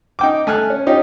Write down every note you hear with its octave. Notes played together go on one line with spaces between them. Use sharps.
D#4 G5 D6
A3 G#5 F6 F#6
C#4
C#4 D#4 F4 G4